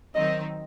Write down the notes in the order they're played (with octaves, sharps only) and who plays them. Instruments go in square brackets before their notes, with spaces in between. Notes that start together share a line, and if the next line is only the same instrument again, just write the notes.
[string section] D#3 F#3 C4 D#4 [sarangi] D#5